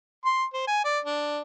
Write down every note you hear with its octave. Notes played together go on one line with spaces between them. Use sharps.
C6
C5
G#5
D5
D4